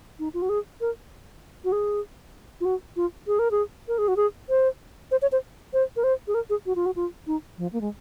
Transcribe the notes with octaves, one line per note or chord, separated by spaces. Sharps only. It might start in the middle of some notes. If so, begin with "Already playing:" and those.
D#4
F4
F#4
G#4
A#4
F#4
G#4
F4
F#4
F4
G#4
A#4
G#4
A#4
G#4
F#4
G#4
C5
C5
C#5
C5
C5
A#4
C5
G#4
A#4
G#4
F#4
F4
F#4
F4
D#4
F3
A#3
G#3